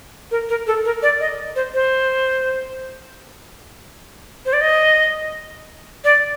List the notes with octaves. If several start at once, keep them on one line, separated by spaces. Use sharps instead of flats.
A#4
A#4
A4
A#4
D5
D#5
C5
C5
C5
D5
D#5
D5